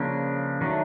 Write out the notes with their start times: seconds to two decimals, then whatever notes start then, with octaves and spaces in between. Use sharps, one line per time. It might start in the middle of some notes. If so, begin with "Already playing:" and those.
Already playing: C#3 F3 A#3 D4
0.61 D#3 F#3 A3 D4